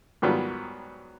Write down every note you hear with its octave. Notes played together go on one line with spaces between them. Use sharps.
G#2 D#3 F#3 G3 B3 F4